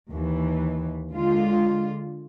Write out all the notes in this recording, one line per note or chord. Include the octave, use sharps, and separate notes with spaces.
D#2 E3
D3 G#3 F4